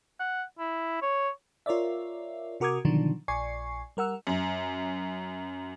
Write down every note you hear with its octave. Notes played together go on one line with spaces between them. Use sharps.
F#5
E4
C#5
F4 A#4 C#5 D5 E5
C3 F#4 A#4 D6 D#6 G#6
B2 D3 D#3 F3 F#3 D4
A#1 D5 G#5 C#6 C7
G3 A#4 F#5 E6
F#2